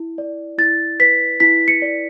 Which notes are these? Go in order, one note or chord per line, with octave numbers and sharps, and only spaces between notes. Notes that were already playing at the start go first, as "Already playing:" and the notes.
Already playing: E4
D5
E4 A6
B4 B6
E4 B6
C#7
D5